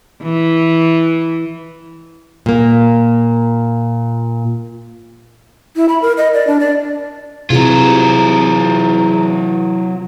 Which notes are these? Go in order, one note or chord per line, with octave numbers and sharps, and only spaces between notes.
E3
A#2 A#3
E4
B5
A#4
D#5
D5
D4
D5
C3 E3 F#3 F4 G#4 A#5